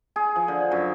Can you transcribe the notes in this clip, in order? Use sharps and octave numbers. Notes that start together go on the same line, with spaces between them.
G#4
F3
D3
F#2